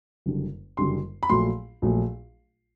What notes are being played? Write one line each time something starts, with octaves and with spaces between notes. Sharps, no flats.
F#1 F#2 D3 G3
F#1 F#2 D3 G3 C6
B5
A#1 A#2 F#3 A3 C6
A#1 A#2 F#3 A3